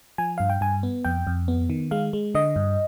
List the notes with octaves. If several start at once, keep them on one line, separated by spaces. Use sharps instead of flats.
F3 G#5
G2 F5
G5
G2 G#5
B3
F2 G5
F2
B3
D#3
G#3 F5
G#3
D3 D#5
G2